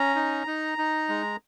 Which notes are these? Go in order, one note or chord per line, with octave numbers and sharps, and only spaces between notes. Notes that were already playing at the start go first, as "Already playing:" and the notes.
Already playing: C#4 A#5
D#4
D#4
D#4
G#3